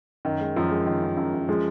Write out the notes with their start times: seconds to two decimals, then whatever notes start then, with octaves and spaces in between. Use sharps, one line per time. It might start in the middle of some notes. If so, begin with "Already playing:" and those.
0.25 F#2 D#3
0.40 G#3
0.56 F#2 F3
0.71 G#3
0.86 F#2 D#3
1.02 F#2
1.17 F#2
1.33 F#2
1.49 F3 G#3